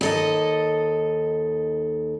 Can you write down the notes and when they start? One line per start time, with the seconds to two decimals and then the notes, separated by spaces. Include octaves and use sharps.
0.01 D#2 A4 D#5